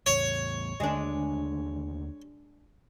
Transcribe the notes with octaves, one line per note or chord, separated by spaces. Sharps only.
A1 E2 A2 C#5
D#2 D3 G#3 A3 D4